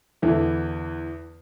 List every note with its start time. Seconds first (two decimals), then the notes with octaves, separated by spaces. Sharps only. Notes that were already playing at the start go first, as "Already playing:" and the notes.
0.22 E2 D3 E3 D4 E4